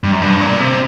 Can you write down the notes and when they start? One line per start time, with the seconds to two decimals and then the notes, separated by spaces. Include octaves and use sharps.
0.04 G2
0.12 F#2
0.22 G2
0.41 A#2
0.60 C3